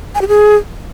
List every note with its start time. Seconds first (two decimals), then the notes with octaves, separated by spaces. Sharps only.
0.15 G#5
0.22 G4
0.28 G#4